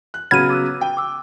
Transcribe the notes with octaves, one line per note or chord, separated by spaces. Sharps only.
F#6
C#3 F#3 B3 F#5 B5 F6 G#6 D#7
D6 E6 F#6
G5
D6 E6